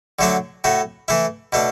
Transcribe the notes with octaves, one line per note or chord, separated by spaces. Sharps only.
D3 F#3 A3 D4 F#4
A2 A3 F#4
E3 A3 E4
B2 A3 D4